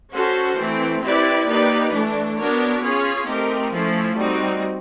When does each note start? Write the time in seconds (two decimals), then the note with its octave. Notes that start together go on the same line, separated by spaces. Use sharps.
0.12 C#4 F#4 A4 C5
0.57 E3 A3 C4
1.02 C4 E4 G4 B4 D5
1.47 A#3 D#4 G4 B4 D5
1.92 E3 A3 D4
2.37 B3 D4 F#4 A#4 C#5
2.81 C#4 F4 G#4 C#5
3.26 A3 C4 D#4 G4 A#4
3.71 F3 A3 C#4 E4 A4
4.16 G3 C4 D#4 F#4